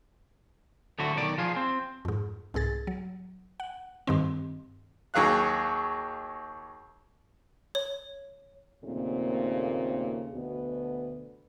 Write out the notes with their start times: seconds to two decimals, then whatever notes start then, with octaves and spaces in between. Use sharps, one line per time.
0.98 D2 A2 D3 F#3 A3 F#4
1.16 B1 D#3 D5
1.38 F3 F4 G#4
1.56 C4
2.05 F2 G#2
2.54 C2 G#2 G#4 A6
2.87 F#3
3.60 F#5
4.07 G2 D#3 C4
5.14 D#2 F#3 G#4 F5 F#6
7.75 C#5
8.84 D#2 A#2 C#3 A3 C4
10.33 D2 B2 B3